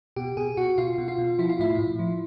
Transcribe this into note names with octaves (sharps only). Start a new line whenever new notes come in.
B2 G4
B2 G#4
B2 F#4
B2 F4
B2
F4
B2
F3 E4
F4
A2 E4
A2
F3